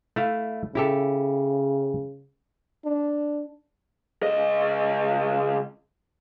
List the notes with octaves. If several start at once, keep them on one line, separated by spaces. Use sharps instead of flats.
A3 E4 F5
C#3 E4 G4 A4
D4
C#2 D#5